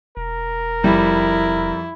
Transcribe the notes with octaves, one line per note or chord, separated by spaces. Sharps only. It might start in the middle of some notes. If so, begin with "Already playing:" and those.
E1 A#4
F2 G3 E4